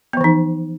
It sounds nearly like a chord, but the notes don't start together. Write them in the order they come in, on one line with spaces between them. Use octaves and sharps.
B3 F3 E3 D#4